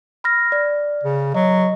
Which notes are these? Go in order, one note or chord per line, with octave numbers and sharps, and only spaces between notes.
B5 F6 A#6
D5
C#3
F#3 D#5